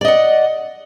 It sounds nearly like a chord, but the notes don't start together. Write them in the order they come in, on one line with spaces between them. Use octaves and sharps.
D5 D#5 F#5